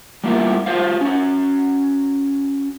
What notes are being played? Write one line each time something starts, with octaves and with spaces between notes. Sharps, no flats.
G3 A#3 B3 E4 F4 A#4
F4 F#4 G#4 B4 C5 F5
C#4 F#4